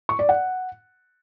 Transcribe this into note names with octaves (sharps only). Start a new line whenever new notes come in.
C#6
D5
F#5